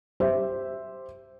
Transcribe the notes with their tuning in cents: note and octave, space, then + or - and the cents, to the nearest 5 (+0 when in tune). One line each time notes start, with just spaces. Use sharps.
G4 +0 C5 +0 E5 +0